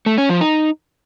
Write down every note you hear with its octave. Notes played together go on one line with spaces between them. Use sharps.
A3
C#4
F3
D#4